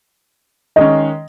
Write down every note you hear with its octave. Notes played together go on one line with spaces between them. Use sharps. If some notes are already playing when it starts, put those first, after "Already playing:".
D#3 G#3 C#4 D#5